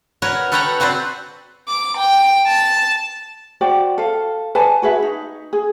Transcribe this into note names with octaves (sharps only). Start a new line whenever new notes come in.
F#4 A#4 B4 C#5
A4 B4 C#5 F#5 G5 A#5
C4 F#4 B4 C5 D5
D6
G5
A5
F#4 C5 D5 G5
A4 F5
B4 D5 G#5 A5
F#4 G#4 B4 E5
D#4
G#4